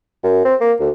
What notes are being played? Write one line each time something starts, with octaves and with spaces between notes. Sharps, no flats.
F#2
C4
A#3
D2